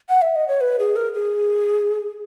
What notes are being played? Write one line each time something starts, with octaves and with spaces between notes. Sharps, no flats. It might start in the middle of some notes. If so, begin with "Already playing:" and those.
F#5
E5
D#5
C#5
B4
G#4
A#4
G#4